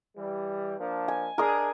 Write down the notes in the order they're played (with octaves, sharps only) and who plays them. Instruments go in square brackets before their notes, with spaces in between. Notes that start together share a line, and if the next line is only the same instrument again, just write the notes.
[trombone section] E3 G3
F3 A#3 D4
[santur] G#5
[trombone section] D4 G#4 [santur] A#4 D#6